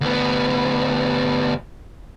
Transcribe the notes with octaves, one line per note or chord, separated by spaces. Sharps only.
D2 B3